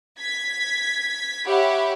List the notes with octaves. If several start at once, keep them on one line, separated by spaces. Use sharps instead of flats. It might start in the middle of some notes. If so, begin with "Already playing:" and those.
G#6 B6
G4 C#5 E5 F#5 B5